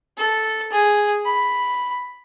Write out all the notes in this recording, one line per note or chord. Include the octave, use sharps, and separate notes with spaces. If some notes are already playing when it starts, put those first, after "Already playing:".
A4
G#4
B5